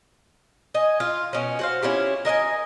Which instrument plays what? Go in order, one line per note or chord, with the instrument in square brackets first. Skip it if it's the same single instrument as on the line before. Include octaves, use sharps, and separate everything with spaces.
[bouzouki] D#5 G#5
F4
B2 C#4
F#4 C5 F5
C#4 E4 F4 G4
A#4 D#5 F5 G#5